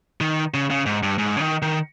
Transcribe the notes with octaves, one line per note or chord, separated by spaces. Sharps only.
D#3
C#3
C#3
G#2
G2
G#2
C#3
D#3
D#3